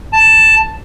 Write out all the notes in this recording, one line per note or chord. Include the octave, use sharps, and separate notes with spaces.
A5